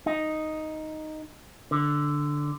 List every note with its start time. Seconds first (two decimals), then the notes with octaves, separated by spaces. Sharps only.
0.06 D#4
1.71 D3